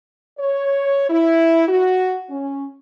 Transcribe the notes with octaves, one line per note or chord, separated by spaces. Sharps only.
C#5
E4
F#4
C#4